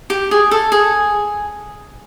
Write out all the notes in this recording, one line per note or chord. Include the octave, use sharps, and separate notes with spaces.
G4
G#4
A4
G#4